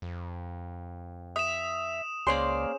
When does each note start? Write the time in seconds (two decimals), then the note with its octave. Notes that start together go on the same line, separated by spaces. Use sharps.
0.02 F2
1.36 E5 D#6 E7
2.27 C#2 A#3 C#4 G#4 C5 D5 C6